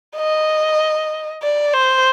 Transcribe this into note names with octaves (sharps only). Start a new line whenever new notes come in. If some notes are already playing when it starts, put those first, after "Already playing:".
D#5
D5
C5